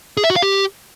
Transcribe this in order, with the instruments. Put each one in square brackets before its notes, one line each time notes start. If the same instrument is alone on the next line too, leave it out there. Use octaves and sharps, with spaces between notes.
[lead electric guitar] G#4
E5
F#4
F5
G4